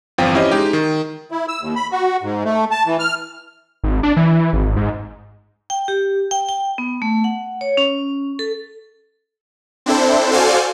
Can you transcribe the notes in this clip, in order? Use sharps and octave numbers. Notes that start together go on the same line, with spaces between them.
G1 E2 F3 C4 F5 G5
C#4 E4 G4 C5 D#5
G#3 D#4 G4
D#3
E4
E6
D#2
B5
F#4
G#2
A3
A5
E3
F6
G#1
D4
E3
G#1
G#2
G5
G4
G5
G5
B3
A3
F#5
C#5
C#4
A4
C4 D4 E4 A4 C5
F#4 A4 C5 D5 F5 G#5